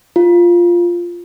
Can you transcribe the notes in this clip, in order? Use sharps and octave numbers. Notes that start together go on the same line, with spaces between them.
F4